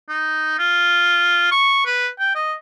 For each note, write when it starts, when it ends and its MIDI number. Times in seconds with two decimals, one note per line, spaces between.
0.09 0.55 63
0.58 1.49 65
1.51 1.81 85
1.86 2.08 71
2.19 2.34 79
2.35 2.53 75